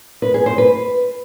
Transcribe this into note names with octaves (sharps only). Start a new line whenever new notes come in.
B4
G#4
C5
B4